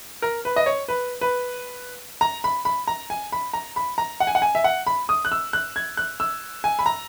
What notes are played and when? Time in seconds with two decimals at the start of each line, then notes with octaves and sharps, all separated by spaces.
0.22 A#4
0.45 B4
0.56 D#5
0.66 C#5
0.88 B4
1.21 B4
2.21 A#5
2.44 B5
2.65 B5
2.88 A#5
3.10 G#5
3.32 B5
3.53 A#5
3.76 B5
3.98 A#5
4.20 F#5
4.27 G#5
4.35 F#5
4.42 G#5
4.55 E5
4.64 F#5
4.87 B5
5.09 D#6
5.25 F#6
5.32 E6
5.53 F#6
5.76 G#6
5.97 F#6
6.20 E6
6.64 G#5
6.79 B5
6.86 A#5